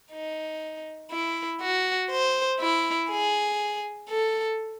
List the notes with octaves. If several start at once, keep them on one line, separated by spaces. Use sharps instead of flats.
D#4
E4
F#4
C5
E4
G#4
A4